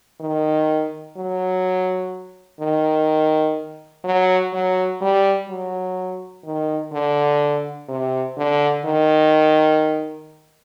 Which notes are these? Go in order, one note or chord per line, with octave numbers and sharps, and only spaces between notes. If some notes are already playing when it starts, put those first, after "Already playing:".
D#3
F#3
D#3
F#3
F#3
G3
F#3
D#3
D3
C3
D3
D#3